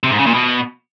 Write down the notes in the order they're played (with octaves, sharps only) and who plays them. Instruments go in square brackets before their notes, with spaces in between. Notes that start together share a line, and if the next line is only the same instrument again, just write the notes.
[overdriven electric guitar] C3
G#2
C#3
A#2
B2